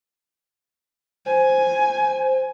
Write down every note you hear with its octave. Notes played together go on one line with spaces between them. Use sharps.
C5 G#5